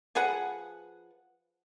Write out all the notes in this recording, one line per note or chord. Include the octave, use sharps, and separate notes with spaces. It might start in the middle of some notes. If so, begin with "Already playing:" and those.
F3 G#4 B4 F#5